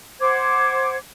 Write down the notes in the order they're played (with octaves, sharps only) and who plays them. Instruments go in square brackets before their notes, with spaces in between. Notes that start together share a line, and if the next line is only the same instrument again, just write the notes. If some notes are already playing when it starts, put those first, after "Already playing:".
[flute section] C5 F#5 D6 G#6